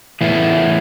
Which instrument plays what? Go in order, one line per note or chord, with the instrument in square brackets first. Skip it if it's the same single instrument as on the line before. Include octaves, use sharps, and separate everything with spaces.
[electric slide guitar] A2 E3 B3 E4 G#4